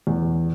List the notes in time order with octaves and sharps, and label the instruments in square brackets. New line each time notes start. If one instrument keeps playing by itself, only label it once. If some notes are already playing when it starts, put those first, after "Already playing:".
[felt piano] E2